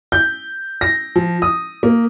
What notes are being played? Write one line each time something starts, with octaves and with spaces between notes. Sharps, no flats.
G6
A#6
F3
D#6
A#3